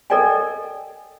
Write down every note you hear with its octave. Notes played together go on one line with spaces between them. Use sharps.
A4 A#4 D5 D#5 G5 G#5